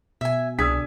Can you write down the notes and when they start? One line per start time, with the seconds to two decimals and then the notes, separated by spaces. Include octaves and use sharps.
0.21 B2 E5 G#5
0.59 C2 D4 G#4 E6 G#6 B6